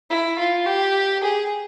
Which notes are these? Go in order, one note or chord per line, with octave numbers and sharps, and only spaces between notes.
E4
F4
G4
G#4